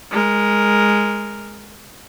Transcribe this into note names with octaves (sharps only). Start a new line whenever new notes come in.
G#3 A#4